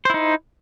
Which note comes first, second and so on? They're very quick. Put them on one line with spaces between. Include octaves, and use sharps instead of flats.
C5 E4 D#4